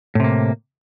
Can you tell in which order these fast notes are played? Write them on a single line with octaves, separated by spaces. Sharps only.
A2 C3 A#3